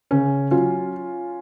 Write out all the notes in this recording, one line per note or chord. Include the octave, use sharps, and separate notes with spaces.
C#3 C#4
F#3 C#4 F4